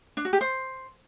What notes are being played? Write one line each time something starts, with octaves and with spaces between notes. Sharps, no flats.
D4
F#4
G4
C5